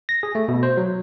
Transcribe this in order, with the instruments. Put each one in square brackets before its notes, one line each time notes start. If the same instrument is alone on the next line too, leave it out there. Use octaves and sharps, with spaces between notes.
[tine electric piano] A#6
G#4
A3
B2
C5
F#3